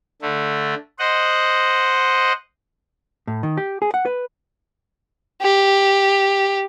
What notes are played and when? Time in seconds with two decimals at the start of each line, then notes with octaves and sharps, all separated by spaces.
0.22 D3 A3
0.99 C5 D#5 F#5
3.27 A2
3.43 D#3
3.57 G4
3.82 G#4
3.94 F#5
4.05 B4
5.42 G4